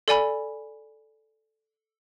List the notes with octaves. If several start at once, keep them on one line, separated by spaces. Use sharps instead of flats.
A4 D5 G#5 B5